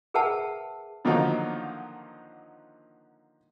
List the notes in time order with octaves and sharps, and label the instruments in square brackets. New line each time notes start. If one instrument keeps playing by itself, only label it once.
[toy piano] G#4 A#4 B4 E5 F#5 A5
[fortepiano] D3 D#3 F3 F#3 A#3 D#4